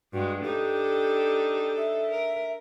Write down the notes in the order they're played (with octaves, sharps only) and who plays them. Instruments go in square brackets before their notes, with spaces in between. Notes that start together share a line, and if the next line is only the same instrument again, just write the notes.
[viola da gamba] G2 G#3 [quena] F#4
[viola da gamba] D4 D#4 A4 [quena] G4
[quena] E5
[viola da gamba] A#4